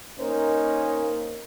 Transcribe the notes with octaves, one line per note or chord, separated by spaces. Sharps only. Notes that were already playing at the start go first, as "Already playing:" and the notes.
A#3 C#4 D#4 A#4 C5